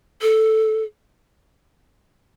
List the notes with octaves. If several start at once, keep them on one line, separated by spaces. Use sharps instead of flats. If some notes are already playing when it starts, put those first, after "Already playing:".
A4